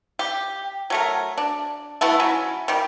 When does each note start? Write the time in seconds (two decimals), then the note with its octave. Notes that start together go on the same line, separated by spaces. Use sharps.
0.19 G4
0.90 F#3 A3 A#4
1.38 D4
2.01 A3 B3 E4 F#4
2.20 F#3 C#4 E4
2.68 D#3 G3